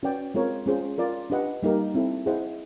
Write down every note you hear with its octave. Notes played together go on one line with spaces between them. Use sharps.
C#4 F#4 B4 D5 G5
G#3 C4 F4 A#4 C#5
G#3 C#4 F4 G#4 C5
F4 A#4 D5
D4 G4 B4 D#5 F#5
G3 A#3 D#4 G4 A#4
C4 E4 A4
E4 G#4 C5 D#5 F#5